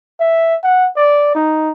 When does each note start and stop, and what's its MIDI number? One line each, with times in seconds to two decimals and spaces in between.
0.20 0.56 76
0.64 0.88 78
0.96 1.35 74
1.35 1.72 63